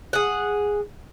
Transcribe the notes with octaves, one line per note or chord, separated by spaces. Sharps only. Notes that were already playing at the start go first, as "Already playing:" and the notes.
G#4 F#5